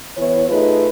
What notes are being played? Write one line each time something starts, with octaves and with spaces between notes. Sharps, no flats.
E3 B3 E4 C#5
A3 D#4 F4 G#4 B4